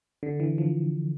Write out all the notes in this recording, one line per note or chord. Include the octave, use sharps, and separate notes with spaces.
D3
E3
F3